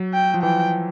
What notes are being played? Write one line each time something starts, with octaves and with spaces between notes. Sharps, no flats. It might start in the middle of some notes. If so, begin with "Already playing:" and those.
Already playing: F#3
G5
F3
E3 G5